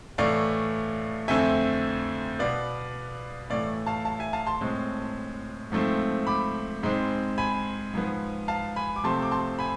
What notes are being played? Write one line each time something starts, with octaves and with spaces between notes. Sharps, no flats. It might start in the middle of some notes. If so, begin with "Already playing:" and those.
A2 E3 A3 D5 F5
F2 D3 A3 C4 E5 G#5
B2 B3 D5 F5
A2 E3 A3 D5 F5
F5 A5
F5 A5
E5 G#5
F5 A5
A5 C6
A2 G#3 C4
G#2 F3 A3 C4
B5 D6
G#2 G#3 C4
G#5 B5
G#2 F3 B3
F5 A5
G#5 B5
D6
C3 F3 A3 C4 A5 C6
D6
A5 C6
G#5 B5